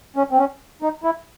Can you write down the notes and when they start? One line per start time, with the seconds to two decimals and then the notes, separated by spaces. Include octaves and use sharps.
0.16 C#4
0.31 C4
0.38 C#4
0.82 D#4
1.04 E4